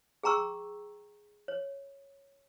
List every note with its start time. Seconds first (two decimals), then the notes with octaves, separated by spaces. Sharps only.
0.23 G#4 G5 A#5 C#6 E6
1.48 C#5